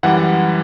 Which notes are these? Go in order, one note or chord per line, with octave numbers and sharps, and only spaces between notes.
F#2 E3 G3 F#5